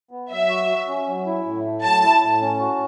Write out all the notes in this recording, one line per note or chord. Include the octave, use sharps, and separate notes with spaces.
B3
F#3 E5
F#4
F#4
C#4
F#3
E4
A2
A3
F#3 A5
E4
A2
C#4
F#4